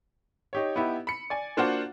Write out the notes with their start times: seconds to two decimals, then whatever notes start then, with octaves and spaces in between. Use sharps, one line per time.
0.53 D#4 G4 C#5
0.76 B3 D#4 E4 G4
1.07 B5 C#7
1.30 D5 G#5
1.57 A#3 D4 F4 F#4 C5 F#5